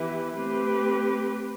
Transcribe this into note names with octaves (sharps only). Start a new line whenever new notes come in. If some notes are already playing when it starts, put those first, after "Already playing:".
Already playing: E3 B3 E4 G4 B4
A3 C4 G4 B4